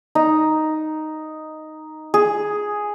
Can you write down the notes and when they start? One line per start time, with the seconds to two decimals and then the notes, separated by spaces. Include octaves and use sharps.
0.15 D#4
2.14 G#4